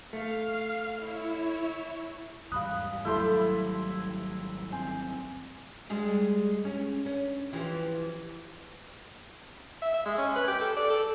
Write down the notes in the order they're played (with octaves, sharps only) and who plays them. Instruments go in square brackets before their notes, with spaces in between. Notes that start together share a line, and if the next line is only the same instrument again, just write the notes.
[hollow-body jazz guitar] A3 [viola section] F5
[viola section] E4 C#5
[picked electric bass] E2 G#2 G3 [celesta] F5 B5 D#6 [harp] F#6
[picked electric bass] G#1 F#3 G3 [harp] A3 G4 A4 [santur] E4 C6
[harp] C4 [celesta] G#5
[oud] G3 G#3 G#4
C#4
C#4
E3 F3 G4
[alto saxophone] E5
E5
G#3
C#4
B4
G4
A4
D5
A4